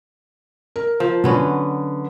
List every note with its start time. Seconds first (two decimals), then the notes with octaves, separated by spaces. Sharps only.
0.76 A#4
1.00 F3
1.24 D3 F#3 B3 C#4